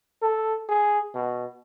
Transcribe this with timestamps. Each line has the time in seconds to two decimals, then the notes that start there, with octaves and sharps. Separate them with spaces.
0.22 A4
0.69 G#4
1.14 B2